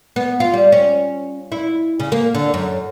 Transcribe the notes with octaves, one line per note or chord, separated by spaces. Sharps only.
B3
F4
G3
C#4
E4
C#3
A#3
D3
F#2